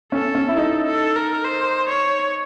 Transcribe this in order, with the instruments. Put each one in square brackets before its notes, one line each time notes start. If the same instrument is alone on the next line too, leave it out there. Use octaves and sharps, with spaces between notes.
[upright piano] C#4 [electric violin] A4
[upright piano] C#4
E4
[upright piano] D#4 [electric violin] A4
[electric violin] A4
A#4
C5
C#5